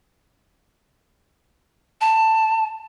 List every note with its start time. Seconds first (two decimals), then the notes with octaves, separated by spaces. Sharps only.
2.01 A5